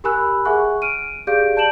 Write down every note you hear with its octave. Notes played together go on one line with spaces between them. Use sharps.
G4 A#4 G#5 B5 E6 F#6
G#4 E5 F#5 G#5 C#6 F#6
F6 D7 D#7
G4 G#4 D5 F5 G6 D7
D5 A5 G6 D7 E7 F#7